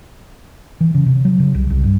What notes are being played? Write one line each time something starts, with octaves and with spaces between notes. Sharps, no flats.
E3
C#3
C3
F#3
C#3
C2
C2
G2